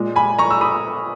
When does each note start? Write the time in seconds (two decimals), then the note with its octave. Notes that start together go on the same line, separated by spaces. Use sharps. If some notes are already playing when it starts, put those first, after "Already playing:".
Already playing: A#2 G#3
0.16 G#5 B5
0.39 A#5 C#6
0.51 E6
0.61 B5 D#6